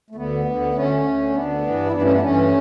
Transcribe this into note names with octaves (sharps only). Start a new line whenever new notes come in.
A3
D2 D3 B3
D2 D3
D2 D3 A3 C#4
D2 D3
D2 D3 B3 D4
G2 E3
E4
G2 E3 B3 D4
A3 C#4
B3 D4
G2 E3 A3 C#4